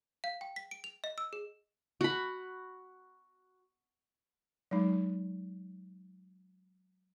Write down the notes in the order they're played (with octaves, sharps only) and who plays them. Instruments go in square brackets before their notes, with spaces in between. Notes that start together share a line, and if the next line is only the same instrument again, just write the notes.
[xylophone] F5
G5
B6
D7
F7
D#5
E6
G#4
[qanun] F#4 B5
[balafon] F#3 G#3 D#4